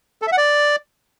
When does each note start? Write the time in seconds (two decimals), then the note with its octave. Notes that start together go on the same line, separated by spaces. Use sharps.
0.22 A4
0.27 E5
0.32 F#5
0.37 D5